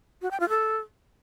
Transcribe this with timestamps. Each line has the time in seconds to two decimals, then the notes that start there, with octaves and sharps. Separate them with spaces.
0.22 F#4
0.31 G5
0.40 F4
0.49 A4